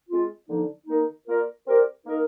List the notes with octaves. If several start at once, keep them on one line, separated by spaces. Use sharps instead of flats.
G#3 C4 F4
D3 F3 A#3 D#4
D#3 A#3 D#4
A#3 F4 A#4 D5
C4 G4 A#4 D5
A#3 D#4 A#4 D#5